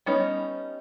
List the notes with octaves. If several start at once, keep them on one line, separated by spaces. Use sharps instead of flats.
G3 B3 C#4 D#4